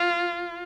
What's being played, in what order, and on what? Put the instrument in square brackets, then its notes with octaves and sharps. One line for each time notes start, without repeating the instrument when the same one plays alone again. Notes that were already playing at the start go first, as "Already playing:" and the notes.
Already playing: [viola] F4